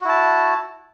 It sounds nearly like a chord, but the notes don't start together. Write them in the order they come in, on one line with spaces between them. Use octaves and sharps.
F#4 E4 A5